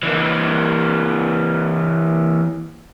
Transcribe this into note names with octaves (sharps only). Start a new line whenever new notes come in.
E3 A#3